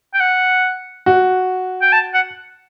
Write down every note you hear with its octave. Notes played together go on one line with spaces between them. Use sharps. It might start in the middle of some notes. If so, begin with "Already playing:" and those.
G5
F#5
F#4
G5
A5
F#5